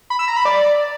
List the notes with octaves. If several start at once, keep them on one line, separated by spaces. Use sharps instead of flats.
B5
E6
A#5
B5
D5